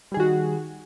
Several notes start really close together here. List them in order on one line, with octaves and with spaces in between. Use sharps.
G3 G#4 D#3 F#4